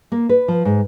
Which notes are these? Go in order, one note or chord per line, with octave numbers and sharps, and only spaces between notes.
A#3
B4
F3
G#2